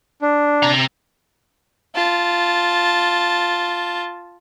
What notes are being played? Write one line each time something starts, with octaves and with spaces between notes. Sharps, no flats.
D4
C3 A#5
F4 A5